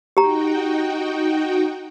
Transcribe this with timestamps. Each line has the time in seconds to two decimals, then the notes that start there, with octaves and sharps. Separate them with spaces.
0.17 D#4 F#4 G4 G5 A#5